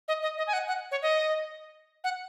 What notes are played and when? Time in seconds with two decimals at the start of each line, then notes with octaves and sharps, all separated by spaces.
0.08 D#5
0.22 D#5
0.38 D#5
0.47 G#5
0.53 F#5
0.68 F#5
0.91 C#5
1.02 D#5
2.04 F#5